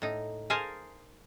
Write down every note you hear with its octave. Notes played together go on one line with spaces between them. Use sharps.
A2 D#4
G#4 A#4 C5 F5 G#5 A5